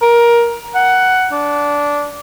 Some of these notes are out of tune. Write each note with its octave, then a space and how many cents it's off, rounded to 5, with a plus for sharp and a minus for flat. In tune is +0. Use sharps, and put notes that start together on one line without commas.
A#4 +15
F#5 +10
D4 -15